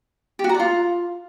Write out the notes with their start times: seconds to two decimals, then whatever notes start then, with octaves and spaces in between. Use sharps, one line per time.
0.39 G4
0.44 F#4
0.49 A#5
0.54 D5
0.60 F4